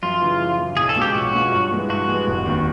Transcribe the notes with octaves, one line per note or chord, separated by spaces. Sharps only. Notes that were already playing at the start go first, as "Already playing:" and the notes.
F#2 F4
C#3 E3
F#2
C#3 E3
B1 G#4
A4
B2 G#3 C#4 F4
G4
B1 F#4
B2 G#3 C#4 F4
G2
E3 G#3 B3
G2 F#4
E3 G#3 B3
F1
D#2 D#3